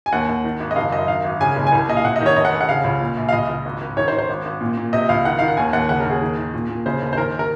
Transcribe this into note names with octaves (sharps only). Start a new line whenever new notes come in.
G#5
D#2 F#5
D#2
D#3
G#1
D#5
F#1 F5
F#2 D#5
D#3 F5
G#1
C#3 G#5
F#1
G#5
C2
A#2 D#5
F5
C3 F#5
D#5
D#3
C#5
F1 D#5
F#5
F1
F#5
C#3 F5
C#2
A#2
A#1
F5
C#2 D#5
C#2
G#1
G#1
D#3 C#5
C5
D#3
C5
G#1
G#1
A#2
A#2
C3 D#5
C#2 F5
D#3 F#5
D#3 F5
F#5
D#2 G#5
D#2 F#5
C#3 F#5
A#4
D#2 G#4
D#3
D#3
A#2
A#2
C#3 C5
D#2
C5
D#3 A#4
A#4